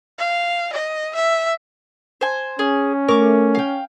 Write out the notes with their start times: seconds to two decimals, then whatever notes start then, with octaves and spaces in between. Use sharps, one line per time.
0.19 F5
0.73 D#5
1.15 E5
2.21 C5 G#5
2.59 C#4 G#4
3.08 A3 A#4 C#6 D6
3.55 F5 G5